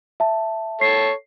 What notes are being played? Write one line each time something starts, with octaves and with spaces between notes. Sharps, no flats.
E5 A5
A4 C#5 C7